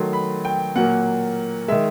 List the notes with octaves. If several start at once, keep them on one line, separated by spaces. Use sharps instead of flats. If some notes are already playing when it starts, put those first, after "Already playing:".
Already playing: D#3 F#3 A3 C6
B5
G5
A#2 F#3 A#3 F#5
D#3 G#3 E5